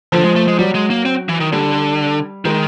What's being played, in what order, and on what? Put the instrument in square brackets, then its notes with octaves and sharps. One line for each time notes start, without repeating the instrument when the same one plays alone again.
[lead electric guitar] D3 [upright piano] F3
[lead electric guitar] G#3
A3
G#3
[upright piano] F#3 [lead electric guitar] G3
[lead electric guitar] G#3
A#3
C4
E3
D#3
[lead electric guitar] D3 [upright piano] G3
[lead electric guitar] D#3 [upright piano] G#3